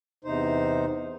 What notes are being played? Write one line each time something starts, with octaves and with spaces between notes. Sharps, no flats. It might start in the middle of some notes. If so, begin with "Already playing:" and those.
E2 C3 D#4 C5